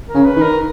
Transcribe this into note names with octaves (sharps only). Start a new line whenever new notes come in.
A#4
C#3
B4
D#3
A#4